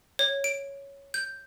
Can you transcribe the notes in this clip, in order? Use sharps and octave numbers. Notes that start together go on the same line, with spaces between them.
C#5
D7
G6